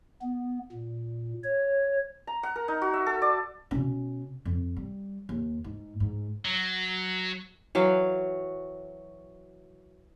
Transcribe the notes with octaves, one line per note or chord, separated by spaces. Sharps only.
B3
A#2
C#5
A#5
F#5
A#4
D#4
F#4
E5
A4
D5
B2 C#4
F2
G3
D#2
G#2
G#2
F#3
E3 F#3 F5